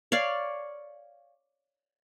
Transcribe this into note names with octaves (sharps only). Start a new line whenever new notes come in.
C#5 D5 F5